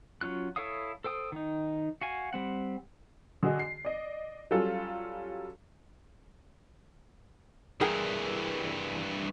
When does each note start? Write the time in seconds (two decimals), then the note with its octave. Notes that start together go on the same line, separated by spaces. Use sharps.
0.21 F#3 C#4 F4 F#6
0.56 E4 A4 C#5 F5 D#6
1.04 A4 C5 G5 D#6
1.32 D#3 D#4
2.01 F#4 F5 G#5
2.33 G3 C4 F#5
3.43 D3 F#4 G#4 D#5
3.59 C7
3.85 D5 D#5
4.51 F#3 G3 C#4 F4 A4
7.81 G2 E3 G#4 A#4 G5